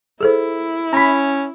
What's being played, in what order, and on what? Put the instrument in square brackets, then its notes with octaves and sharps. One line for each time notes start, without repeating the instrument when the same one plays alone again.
[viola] E4 [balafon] G#4 A4 C5
[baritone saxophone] C#4 [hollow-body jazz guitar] A#5 B5